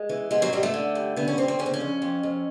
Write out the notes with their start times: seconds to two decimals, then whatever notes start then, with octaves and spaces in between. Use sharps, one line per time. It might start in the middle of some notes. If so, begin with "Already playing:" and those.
Already playing: G#3
0.09 E3
0.31 G#2 G#3
0.42 F#3
0.53 G#2 G3
0.63 A3
0.74 D3
0.95 G2
1.16 D3 B3
1.28 C#4
1.37 D3 C4
1.48 C4
1.59 C#3 C#4
1.66 C4
1.74 C#4
1.80 F2
2.02 F2
2.23 F2